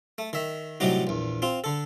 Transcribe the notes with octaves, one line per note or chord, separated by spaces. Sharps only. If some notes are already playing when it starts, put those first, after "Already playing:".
A3
D#3 E5
A2 C3 F#3 G3 D#4 F#4
A#1 E2
C4 F4
D3 A4